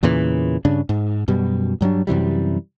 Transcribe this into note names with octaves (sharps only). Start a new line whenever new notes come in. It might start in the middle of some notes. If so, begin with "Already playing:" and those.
E2 A#2 C#3 E3
G2 C#3 D4
G#2
F#2 B2 G3
G2 F#3 G3 D4
F#2 C3 E3 G3